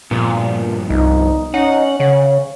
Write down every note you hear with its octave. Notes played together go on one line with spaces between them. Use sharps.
G2 A#2 F3 B3
C2 D#4
C#4 D#4 F#5
C#3 C#5